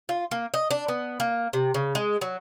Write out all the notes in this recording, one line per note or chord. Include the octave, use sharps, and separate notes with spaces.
F4
A#3
D#5
D4
B3
A#3
C3
C#3
G#3
F#3